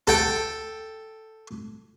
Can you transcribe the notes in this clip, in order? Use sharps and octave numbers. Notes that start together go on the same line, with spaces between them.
A4 G5